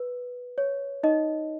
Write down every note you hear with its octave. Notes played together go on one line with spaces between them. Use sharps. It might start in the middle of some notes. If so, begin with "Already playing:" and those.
Already playing: B4
C#5
D#4 D#5